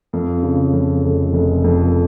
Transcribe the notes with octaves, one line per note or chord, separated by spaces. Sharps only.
F2
C#3
F2
F1
F1
F2